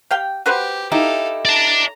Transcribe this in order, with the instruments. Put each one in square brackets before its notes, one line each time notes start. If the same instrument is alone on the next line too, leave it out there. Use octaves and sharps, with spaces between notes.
[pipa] G4 F5 G5
[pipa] F#4 B4 C5 [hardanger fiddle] G4
[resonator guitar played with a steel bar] D#4 E4 G4 [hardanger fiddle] A4 F5
[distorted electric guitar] D5 A5 [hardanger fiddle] A#5